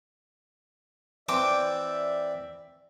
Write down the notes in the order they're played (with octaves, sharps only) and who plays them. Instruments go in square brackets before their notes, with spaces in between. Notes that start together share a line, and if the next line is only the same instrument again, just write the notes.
[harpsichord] E3 C4 G5 [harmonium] D5 E5 [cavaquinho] D6